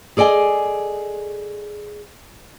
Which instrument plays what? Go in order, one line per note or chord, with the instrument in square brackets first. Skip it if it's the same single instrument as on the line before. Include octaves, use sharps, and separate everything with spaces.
[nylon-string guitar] G#4 A4 D5 D#5 G#5